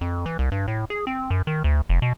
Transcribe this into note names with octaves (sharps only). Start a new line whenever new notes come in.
F2
E3
C2
G2
A2
G#4
C4
F#2
D#3
D2
F1
B2